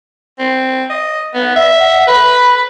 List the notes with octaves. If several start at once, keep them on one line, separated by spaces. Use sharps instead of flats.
C4
D#5
B3
E5
F#5
B4 B5